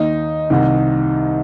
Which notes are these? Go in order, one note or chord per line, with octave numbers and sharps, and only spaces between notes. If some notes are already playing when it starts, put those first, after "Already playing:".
Already playing: D#2 D#3 D#4
C2 C3 D#3